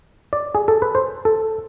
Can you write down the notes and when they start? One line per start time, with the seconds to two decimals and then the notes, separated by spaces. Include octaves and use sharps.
0.33 D5
0.55 G#4
0.68 A4
0.82 B4
0.95 C5
1.25 A4